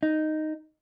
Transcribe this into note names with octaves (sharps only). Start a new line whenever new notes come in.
D#4